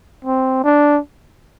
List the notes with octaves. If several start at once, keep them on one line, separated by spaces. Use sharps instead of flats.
C4
D4